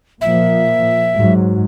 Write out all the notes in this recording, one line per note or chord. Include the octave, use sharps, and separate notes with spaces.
A#2 F3 E5
G#2 F#3